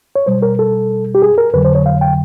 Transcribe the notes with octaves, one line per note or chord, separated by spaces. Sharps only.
C#5
B2 G3 C5
A#4
A4
G4
G#4
A#4
F2 D3 F#3 B4
C5
C#5
F5
G5